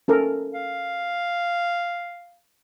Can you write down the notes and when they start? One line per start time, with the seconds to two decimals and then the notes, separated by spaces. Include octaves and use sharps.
0.08 C#4 A4 A#4
0.54 F5